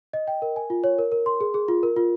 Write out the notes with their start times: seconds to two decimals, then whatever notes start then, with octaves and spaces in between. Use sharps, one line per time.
0.13 D#5
0.27 G5
0.42 A#4
0.56 G#5
0.70 F4
0.84 C#5
0.99 A#4
1.12 A#4
1.26 C6
1.41 G#4
1.54 G#4
1.68 F4
1.83 A#4
1.96 F4